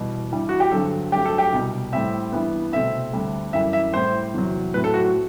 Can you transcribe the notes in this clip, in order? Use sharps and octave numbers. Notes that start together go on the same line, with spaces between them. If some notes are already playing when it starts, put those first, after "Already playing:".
Already playing: E2 B2 G3
G2 E3 G3
F#4
G4
G2 D3 F#3 C4 A4
G2 F#3 A3 C4 G4
A4
G4
C2 B2 G3
A2 G3 C4 E5
G2 E3 G3 B3
C2 B2 A3 C4 E5
D2 D3 G3 C4
F#2 E3 G3 E5
E5
A2 G3 C4 C5
E2 C3 F#3
A2 F#3 C4 B4
A4
F#4
F#4